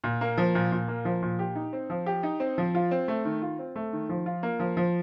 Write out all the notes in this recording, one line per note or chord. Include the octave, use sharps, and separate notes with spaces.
A#2
A#3
F3
A#2
A#2
A#3
F3
A#2
G4
D#4
C4
F3
G4
D#4
C4
F3
F4
C4
A3
D#3
F4
C4
A3
D#3
F3
F4
A#3
F3
F3